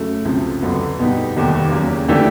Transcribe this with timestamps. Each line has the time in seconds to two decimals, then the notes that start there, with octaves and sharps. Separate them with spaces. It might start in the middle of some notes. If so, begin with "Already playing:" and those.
Already playing: F#2 C#3 F#3 A3
0.25 C#2 C3 F3
0.62 G1 F2 D3 F#3 B3
0.98 B2 G3 B3 D#4 G4
1.35 F1 D#2 D#3 G3 B3
1.72 E2 C#3 F#3 A#3
2.08 E3 A3 D4 G4